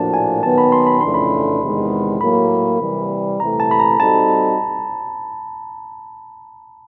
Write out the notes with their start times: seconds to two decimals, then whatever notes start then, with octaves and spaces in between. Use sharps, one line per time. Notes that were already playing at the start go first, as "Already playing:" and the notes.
Already playing: A2 F3 A#3 D4 F#4 A5
0.14 G#5
0.43 D#3 F#3 B3 A5
0.58 B5
0.72 C6
0.87 B5
1.01 F2 C#3 E3 A3 D4 C6
1.14 B5
1.62 E2 C3 D#3 G#3 B3
2.21 A2 F#3 A#3 B5
2.81 C3 E3 G3
3.40 C3 E3 A3 A#5
3.60 A5
3.71 B5
3.80 A#5
3.99 G3 C4 D#4 F#4 A4 A5